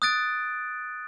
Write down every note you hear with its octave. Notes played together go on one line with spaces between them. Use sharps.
D#6 F#6 A6 D7